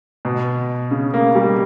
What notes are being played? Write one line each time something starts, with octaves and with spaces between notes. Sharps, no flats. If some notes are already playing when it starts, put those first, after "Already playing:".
B2
C#3
A#3
G3